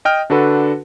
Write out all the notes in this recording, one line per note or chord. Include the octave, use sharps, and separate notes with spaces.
D#5 G5 F6
D3 D4 F#4 A4 B4